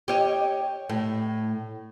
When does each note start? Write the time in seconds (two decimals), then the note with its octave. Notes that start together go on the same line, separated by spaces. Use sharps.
0.08 G4 C#5 D#5
0.90 A2